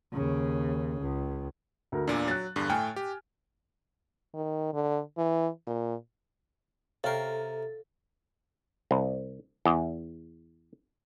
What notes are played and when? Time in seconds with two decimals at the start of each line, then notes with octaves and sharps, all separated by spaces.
0.13 D#2 C#3
1.02 C#2
1.92 D2 A#4
2.07 E2 A#2 D4
2.28 F#3 F#6 A6
2.56 E2 G2 D3
2.69 A2 A3 G5 G#5 F6
2.96 G4
4.34 D#3
4.73 D3
5.17 E3
5.67 A#2
7.04 C3 A4 A#4 C#5 F5 G5
8.91 C2
9.65 E2